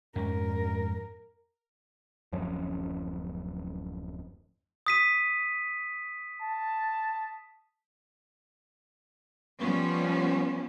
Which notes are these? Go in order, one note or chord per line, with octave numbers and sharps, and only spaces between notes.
F2 G#2 C#4 A#4
D1 F#2 F3 C#4
D#6 B6 D#7
A5
F3 G3 B3 C#4